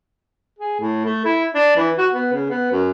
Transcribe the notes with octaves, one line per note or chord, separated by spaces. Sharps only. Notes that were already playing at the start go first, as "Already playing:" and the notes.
G#4
A2
A3
E4
D4
E3
F#4
B3
C#3
B3
F#2